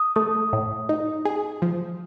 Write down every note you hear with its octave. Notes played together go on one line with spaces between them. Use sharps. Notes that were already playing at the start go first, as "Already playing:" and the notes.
Already playing: D#6
A3 D#6
A2
D#4
G#4
F3